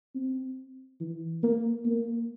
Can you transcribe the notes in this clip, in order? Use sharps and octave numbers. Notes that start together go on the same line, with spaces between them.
C4
E3
A#3
A#3